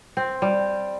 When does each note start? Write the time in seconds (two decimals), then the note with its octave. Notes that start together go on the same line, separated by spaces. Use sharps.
0.17 C4
0.42 G3